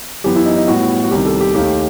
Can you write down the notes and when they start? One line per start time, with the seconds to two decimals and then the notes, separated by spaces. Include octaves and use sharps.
0.24 F#2 E3 B3 G4
0.35 E4
0.45 D#4
0.57 D#4
0.68 A2 G3 B3 F#4
1.04 F#4
1.11 C2 C3 D#3 G4
1.25 A4
1.41 G4
1.55 D#2 D#3 A3 G4